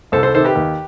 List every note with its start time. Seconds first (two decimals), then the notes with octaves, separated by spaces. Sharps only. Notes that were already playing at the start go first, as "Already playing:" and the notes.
0.12 C2 A4 C5
0.23 A4 C5
0.34 C3 D#3 A4 C5
0.45 G4 B4
0.55 D#2